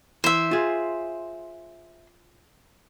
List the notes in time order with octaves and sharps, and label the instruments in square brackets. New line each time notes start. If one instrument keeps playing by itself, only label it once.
[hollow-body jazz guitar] E3 [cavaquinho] C5 E5
[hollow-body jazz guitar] F4 G#4